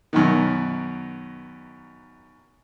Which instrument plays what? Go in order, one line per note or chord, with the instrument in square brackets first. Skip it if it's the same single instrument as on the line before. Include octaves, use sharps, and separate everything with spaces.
[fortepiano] F#2 B2 D#3